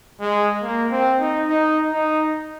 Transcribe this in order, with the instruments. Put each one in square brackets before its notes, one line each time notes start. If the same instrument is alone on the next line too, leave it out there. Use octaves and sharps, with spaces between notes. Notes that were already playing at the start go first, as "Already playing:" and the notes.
[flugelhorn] G#3
A#3
C4
D#4
D#4
D#4